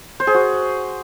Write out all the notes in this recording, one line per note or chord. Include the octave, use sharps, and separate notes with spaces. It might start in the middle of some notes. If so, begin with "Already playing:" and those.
C5
G#4
F#4